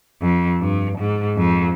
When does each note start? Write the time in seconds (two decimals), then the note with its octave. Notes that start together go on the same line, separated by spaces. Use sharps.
0.22 F2
0.61 G2
0.98 G#2
1.37 F2